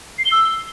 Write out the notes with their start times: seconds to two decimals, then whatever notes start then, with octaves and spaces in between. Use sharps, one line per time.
0.19 C7
0.25 G7
0.32 E6